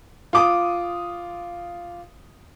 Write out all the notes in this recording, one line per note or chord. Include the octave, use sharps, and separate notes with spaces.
F4 D6 D#6